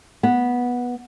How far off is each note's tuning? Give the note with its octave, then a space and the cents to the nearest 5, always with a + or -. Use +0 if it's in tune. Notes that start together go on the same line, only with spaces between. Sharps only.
B3 -10